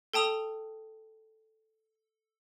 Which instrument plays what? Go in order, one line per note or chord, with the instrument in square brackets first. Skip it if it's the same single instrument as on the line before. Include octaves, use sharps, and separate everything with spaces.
[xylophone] A4 G5 A5 D#6 F7